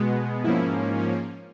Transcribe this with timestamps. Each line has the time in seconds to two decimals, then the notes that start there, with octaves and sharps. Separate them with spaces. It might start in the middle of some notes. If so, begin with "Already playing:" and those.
Already playing: B2 G#3 B3
0.44 G#2 F3 A#3 C#4 E4